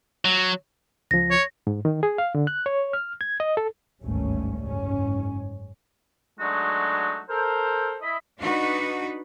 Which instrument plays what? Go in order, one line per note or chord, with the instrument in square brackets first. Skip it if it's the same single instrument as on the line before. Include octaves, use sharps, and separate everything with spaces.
[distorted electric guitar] F#3
[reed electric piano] C#2 F3 [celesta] A#6
[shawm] C#5
[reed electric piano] G#2
D#3
G#4
F5
D3
F#6
C#5
F6
G#6
D#5
A4
[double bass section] G#1 D2 G2 G3 A3 C#4
F#1 G#2 C#4
[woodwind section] F#3 G#3 A3 D4 D#4 F#4
A4 A#4 C5
E4 D#5 B5
[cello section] D4 D#4 F#4 B4